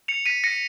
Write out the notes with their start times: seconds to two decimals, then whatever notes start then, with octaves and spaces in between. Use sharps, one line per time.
0.08 C#7 F7
0.26 B6 D#7
0.44 A#6 C#7